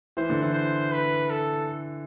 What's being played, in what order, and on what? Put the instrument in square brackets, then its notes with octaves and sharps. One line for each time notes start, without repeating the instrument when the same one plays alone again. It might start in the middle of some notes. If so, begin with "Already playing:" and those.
[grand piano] E3 [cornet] C5
[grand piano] D3
E3
[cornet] C5
B4
A4